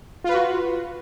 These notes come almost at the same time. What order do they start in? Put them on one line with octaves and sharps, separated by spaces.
F4 B4 F#4